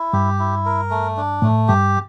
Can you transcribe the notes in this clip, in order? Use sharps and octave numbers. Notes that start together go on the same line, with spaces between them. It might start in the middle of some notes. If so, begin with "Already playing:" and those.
Already playing: E4
G2 G4
E4
A#4
A3
D4
A2 A3
G2 G4